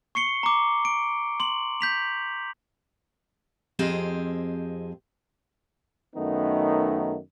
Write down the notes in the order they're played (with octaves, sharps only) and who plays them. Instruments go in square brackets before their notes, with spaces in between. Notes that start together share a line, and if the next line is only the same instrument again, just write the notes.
[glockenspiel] C#6 C7 C#7 G7
A#5 D6
D7
C6 F#7
G6 B6 F7
[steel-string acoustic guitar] F2 C4 G4 G#4 D#5
[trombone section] F#2 D#3 A3 B3 D#4